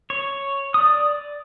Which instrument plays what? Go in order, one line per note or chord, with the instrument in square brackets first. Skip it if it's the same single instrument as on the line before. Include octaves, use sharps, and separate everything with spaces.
[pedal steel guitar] C#5
D5 D#6